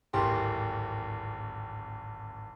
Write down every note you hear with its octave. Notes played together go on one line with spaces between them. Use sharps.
D1 G#1 G4 C6